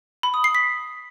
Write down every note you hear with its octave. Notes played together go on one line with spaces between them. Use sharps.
B5
D#6
C7
B6